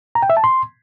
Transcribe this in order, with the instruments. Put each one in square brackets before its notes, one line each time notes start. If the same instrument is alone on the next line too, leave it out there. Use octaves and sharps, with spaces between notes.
[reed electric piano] A#5
G5
E5
A5
C6